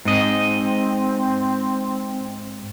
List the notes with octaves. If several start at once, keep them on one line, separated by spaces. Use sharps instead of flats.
G#2 C4 D#5